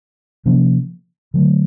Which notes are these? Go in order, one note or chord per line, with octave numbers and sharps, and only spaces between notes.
C3 F3 A#3 C#4
D3 F#3 A3